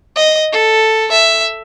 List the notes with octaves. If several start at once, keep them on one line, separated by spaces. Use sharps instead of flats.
D#5
A4
E5